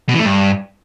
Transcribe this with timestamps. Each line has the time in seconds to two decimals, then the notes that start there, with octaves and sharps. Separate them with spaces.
0.09 B2
0.14 E3
0.19 A3
0.25 G2